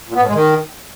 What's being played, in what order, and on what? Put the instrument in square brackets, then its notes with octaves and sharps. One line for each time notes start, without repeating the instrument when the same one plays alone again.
[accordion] A#2
B3
A2
G#3
D#3